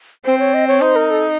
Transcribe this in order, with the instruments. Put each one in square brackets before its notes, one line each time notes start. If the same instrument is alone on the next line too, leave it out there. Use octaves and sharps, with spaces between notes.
[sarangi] C4 [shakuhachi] C5
[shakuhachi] C#5
D#5
C#5
[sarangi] D#4 [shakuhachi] C5
[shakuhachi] A#4
A4